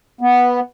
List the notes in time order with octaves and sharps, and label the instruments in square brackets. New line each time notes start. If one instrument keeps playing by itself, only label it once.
[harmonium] B3